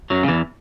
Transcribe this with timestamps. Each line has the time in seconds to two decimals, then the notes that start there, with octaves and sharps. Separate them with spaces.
0.10 F#2 F#3
0.23 C#3
0.28 E2 E3